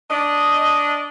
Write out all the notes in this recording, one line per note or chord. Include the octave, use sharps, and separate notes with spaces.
D4 D#5